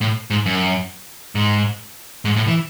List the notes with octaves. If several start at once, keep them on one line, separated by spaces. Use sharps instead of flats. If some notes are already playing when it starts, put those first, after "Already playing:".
A2
G#2
F#2
G#2
G#2
A2
E3